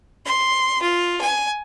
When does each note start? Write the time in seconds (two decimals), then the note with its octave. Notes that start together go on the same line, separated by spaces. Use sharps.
0.25 C6
0.82 F4
1.22 G#5